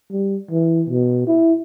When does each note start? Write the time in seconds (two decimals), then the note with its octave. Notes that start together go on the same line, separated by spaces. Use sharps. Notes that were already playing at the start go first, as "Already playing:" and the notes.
0.11 G3
0.51 E3
0.90 B2
1.27 E4